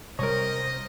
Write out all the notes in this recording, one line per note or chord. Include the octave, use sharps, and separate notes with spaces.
C3 G3 A#4 C5 C#5 D#5